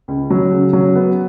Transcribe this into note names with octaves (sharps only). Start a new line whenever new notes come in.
C#2
F#3
C#3
F#3
B3